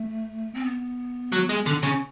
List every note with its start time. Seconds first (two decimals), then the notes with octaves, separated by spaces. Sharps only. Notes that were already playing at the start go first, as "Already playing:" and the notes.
Already playing: A3
0.54 C4
0.66 B3
1.32 F#3
1.49 G#3
1.66 D3
1.83 C#3